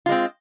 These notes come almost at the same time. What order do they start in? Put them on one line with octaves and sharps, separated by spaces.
F4 G#3 C4